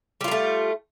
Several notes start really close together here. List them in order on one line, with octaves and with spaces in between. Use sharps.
G3 F4 A#3 A3